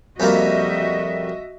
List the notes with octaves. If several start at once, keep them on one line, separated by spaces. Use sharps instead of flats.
F2 G3 A#3 F#4 D#5 E5